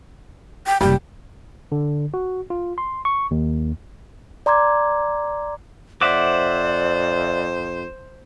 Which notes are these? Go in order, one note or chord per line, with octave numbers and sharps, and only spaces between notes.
G5
F#1 C2 G3 G4 G5
D3
F#4
F4
C6
C#6
D#2
D5 A#5 C6 D6 G#6
F2 C5 D5 E5 F#5 D6